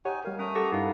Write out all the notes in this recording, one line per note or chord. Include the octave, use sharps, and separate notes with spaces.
D#4 G4 C#5 F#5 G#5
G3 A#4 F5
A3 C#4 A#5 D#6
G4 A4 F#5 A#6
G2 D#4 E4 F5